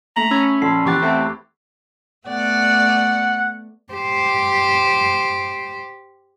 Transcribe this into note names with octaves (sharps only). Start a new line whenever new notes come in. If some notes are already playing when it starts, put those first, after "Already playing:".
A3 A#5 B6 F#7
C#4 B5 E6 G#6
A#1 A4 B5 C6 C7
E2 G4 C#6 D6 F#6 A6
A3 C4
A3 B3 D5 F#5
G4 C5